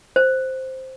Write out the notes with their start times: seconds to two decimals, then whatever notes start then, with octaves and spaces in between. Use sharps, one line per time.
0.16 C5